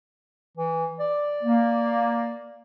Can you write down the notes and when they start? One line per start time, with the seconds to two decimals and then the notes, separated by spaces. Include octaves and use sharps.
0.57 E3
1.00 D5
1.43 A#3